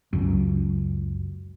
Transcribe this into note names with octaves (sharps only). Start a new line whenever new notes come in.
C#2 F#2